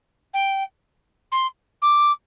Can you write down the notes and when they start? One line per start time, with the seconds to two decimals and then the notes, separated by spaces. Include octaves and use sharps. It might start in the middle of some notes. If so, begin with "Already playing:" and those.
0.33 G5
1.31 C6
1.81 D6